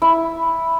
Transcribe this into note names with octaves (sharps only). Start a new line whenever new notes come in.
E4